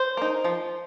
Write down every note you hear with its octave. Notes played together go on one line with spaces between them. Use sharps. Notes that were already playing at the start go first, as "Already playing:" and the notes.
Already playing: C5
A#3 D#4
F3